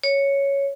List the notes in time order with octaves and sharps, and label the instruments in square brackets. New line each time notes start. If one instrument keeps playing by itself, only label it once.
[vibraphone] C#5